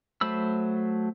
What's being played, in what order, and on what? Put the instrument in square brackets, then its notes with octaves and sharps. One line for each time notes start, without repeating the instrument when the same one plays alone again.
[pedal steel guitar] F#3 A3 C5 B5 E6